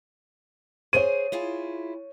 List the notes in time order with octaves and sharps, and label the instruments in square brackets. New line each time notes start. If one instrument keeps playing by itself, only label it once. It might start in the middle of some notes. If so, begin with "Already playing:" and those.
[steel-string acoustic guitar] G#4 C5 G#5 [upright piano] C#5 D#7
[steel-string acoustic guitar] E4 F4 G#4